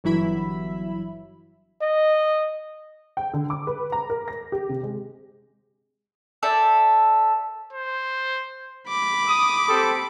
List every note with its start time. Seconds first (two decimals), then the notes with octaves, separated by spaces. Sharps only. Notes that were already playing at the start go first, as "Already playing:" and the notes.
0.04 G1 E3 F#3 E4 E5 B5
1.81 D#5
3.17 G5
3.34 D3
3.50 D6
3.67 B4
3.92 A#5
4.10 A#4
4.28 A#6
4.52 G4
4.69 C3
4.83 G#3
6.43 A4 C5 D5 E5
7.73 C5
8.88 B5 D6
9.28 D#6
9.69 C4 G4 A4